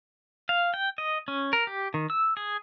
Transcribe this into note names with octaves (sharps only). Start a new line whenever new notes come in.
F5
G5
D#5
C#4
A#4
G4
D#3
E6
G#4